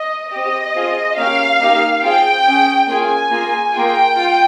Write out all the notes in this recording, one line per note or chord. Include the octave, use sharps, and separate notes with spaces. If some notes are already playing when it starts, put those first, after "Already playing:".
Already playing: D#5
C4 G4 D#5
C4 F4 G#4
A#3 C#4 G4 F5
A#3 D#4 G4
C4 F4 G#4 G5
C#4 G#4
A#3 C#4 F4 G#4 G#5
A#3 F4 G#4
A#3 F4 G#4 G5
F4